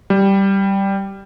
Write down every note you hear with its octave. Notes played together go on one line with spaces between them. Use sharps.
G3